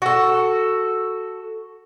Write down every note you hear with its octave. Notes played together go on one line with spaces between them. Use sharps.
F#4 A4